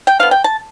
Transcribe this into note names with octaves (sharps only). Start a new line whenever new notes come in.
G5
D3 F3 B3 F5
G5
A5